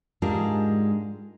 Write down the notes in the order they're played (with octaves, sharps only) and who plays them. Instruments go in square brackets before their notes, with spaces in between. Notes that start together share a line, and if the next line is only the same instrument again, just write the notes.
[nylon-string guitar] G#2 G3 G#3 D4 F4 A#4